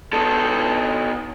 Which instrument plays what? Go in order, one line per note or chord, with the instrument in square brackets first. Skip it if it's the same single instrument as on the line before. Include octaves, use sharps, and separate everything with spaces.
[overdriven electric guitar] B2 A4